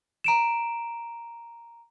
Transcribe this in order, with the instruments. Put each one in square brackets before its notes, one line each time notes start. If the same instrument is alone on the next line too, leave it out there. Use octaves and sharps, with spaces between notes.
[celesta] A#5 D7 E7